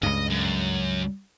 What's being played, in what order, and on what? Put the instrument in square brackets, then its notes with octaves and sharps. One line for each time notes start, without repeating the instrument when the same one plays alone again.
[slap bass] C#2 G2 [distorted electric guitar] D#5
[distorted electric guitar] F#2